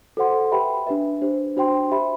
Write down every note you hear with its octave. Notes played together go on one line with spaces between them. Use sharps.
F#4 A4 C5 F#5 C6
G4 B4 E5 G5 B5
D4 G4 B4 E5
D4 G4 C5
D4 F#4 C5 G5 C6
G4 C5 E5 B5